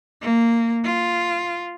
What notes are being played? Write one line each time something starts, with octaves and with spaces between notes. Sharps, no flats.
A#3
F4